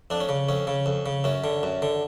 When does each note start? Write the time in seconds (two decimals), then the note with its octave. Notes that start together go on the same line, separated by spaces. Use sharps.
0.10 F2 D4
0.20 C#4
0.29 C#3
0.49 F2 C#4
0.67 C#3
0.86 F2
1.06 C#3
1.24 F#2 C#4
1.44 D3
1.63 F#2
1.82 D3